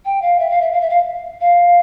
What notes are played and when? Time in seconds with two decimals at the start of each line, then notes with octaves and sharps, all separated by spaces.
0.05 G5
0.22 F5
0.39 E5
0.50 F5
0.61 E5
0.72 F5
0.81 E5
0.90 F5
1.41 F5